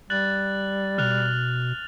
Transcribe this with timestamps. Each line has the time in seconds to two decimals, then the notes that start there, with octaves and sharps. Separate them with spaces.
0.10 G3 F#6 A6 F#7
0.98 B2 F6 F#6 F7